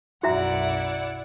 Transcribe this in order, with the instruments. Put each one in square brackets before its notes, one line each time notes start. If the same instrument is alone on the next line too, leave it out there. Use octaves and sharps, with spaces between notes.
[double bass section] B1 F#2 [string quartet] E4 D5 F#5 [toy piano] F#4 E5 A#5